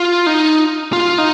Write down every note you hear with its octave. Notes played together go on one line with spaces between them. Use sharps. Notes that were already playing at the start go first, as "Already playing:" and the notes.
Already playing: F4
D#4
F4
D#4